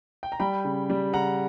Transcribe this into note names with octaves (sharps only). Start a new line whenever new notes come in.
G5
A#5
G3 G5 B5
C#3
G3
C#3 F#5 A#5